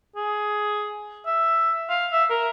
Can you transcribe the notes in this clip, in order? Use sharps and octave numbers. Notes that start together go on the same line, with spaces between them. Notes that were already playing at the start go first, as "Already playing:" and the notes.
G#4
E5
F5
E5
A#4